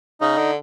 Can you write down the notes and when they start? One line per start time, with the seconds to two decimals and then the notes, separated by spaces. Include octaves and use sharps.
0.21 C#3 D#4
0.38 D3